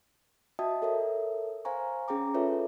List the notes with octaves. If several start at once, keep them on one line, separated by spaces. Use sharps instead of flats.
F#4 D#5 E5 G5 A5 D#6
A4 A#4 C#5 E5
C5 F5 G#5 A#5 C#6
C#4 G#4 G5 A#5 D6
F4 G#4 A4 B4 C#5 E5